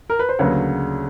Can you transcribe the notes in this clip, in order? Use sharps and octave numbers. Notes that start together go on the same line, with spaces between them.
A#4
B4
C5
D2 C#3 F#3 A#3 B4 C#5